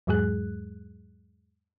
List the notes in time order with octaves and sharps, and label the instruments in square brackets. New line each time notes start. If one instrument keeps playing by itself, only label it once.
[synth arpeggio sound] E2 G#2 F#3 G#3 G#4 F#6